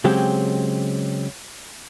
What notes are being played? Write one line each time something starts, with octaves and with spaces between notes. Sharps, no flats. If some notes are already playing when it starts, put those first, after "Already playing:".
C#3 F#3 G#3 C4 G4